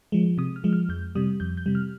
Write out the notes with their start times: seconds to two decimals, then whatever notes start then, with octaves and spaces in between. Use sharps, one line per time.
0.12 F3 G#3
0.38 C3 D#6
0.56 F6
0.64 F3 G#3
0.73 F6
0.89 F2 G6
1.15 C3 G3 D#6
1.40 F2 G6
1.57 G6
1.66 C3 G3
1.75 F6